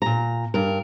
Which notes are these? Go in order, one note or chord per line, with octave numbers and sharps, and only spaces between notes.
A#2 A#5
G2 A#4